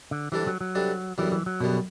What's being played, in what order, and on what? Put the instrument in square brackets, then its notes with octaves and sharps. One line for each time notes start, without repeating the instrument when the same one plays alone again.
[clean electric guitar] D3
[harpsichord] C3 G3 D4 A4 [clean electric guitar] E3
[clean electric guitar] F#3
F#3
[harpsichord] C3 G3 D4 A4
[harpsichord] F#2 D3 G3 B3 [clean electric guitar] E3
[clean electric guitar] E3
F#3
[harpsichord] F#2 D3 G3 B3 [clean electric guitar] B2